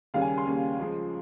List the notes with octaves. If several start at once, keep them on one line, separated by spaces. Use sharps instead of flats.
D#2 C#3 G3 A#3 C#4 F5
G#5
C6
D#2 C#3 G3 A#3 C#4
C#2 C#3 F3 G#3